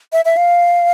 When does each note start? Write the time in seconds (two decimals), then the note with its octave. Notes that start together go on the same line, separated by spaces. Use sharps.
0.13 E5
0.25 E5
0.37 F5